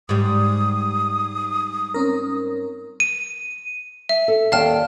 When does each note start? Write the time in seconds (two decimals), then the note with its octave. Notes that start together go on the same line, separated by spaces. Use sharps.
0.09 G#2 G3 D#6
1.94 C4 C#4 A#4
3.00 D#7
4.09 E5
4.28 A4
4.52 D#2 D5 F5 G5 A5 F6